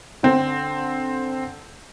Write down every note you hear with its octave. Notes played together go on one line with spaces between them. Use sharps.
D3 C4